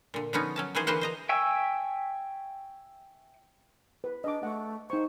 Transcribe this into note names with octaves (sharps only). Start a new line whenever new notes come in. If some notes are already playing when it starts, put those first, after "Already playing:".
A#2 D3
D3 F3 B3 C#4 D#4
F#3 C#4 A5
D#3 E3 F#4 G#4 C5
D3 E3 A#3 B4 C5 F#5
C5 D#5 A#5
E5 G5 G#5 C#6 E6
B4
D4 D#5 D6
A3 F#5 C#6
D#4 C5 C#6